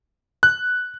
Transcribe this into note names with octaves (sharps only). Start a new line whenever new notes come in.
F#6